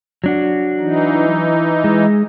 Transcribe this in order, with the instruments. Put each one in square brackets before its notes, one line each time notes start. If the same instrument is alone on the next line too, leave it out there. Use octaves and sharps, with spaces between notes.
[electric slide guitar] F#3 D4 F#4
[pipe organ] E3 D#4
[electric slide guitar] G#3